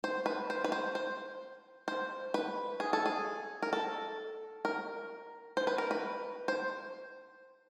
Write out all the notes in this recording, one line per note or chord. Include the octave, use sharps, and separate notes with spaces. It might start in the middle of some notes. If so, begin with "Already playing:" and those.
C5
B4
C5
B4
C5
C5
C5
B4
G#4
A4
G#4
A#4
A4
A#4
C5
B4
A#4
B4
C5